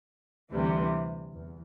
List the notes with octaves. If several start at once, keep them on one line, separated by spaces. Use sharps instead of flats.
D2 C3 E3 G3
E2